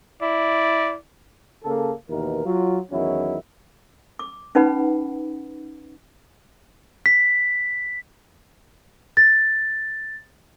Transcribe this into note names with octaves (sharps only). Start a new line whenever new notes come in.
E4 D5
C#3 A#3 A4
D#2 B2 E3 A#4
F#3 F4
E2 D#3 F#3 C#4 E4
D6
C#4 D#4 B4 F#5 B5
B6
A6